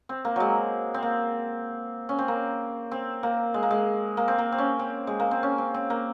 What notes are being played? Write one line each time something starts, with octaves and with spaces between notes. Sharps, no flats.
C4
A#3
F#3 G#3
C4
A#3
C#4
C4
A#3
C4
A#3
G#3
A#3
G#3
A#3
C4
A#3
C4
C#4
C4
G#3
A#3
C4
C#4
C4
C4
A#3